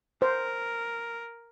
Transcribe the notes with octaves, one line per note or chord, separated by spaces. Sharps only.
A#4 C5